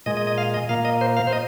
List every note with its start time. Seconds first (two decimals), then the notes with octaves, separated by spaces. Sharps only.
0.06 A#2 G#3 D#5
0.17 D#5
0.27 D#5
0.38 F5
0.54 D#5
0.69 A#2 A#3 F5
0.85 D#5
1.01 C5
1.17 F5
1.27 C5
1.33 D#5